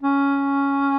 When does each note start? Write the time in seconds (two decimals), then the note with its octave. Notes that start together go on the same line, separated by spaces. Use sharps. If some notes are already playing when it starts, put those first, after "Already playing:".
0.01 C#4